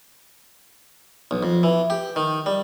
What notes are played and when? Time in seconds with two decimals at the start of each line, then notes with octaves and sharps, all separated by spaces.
1.31 B1
1.43 F2
1.63 E3
1.90 G4
2.16 D#3
2.46 G3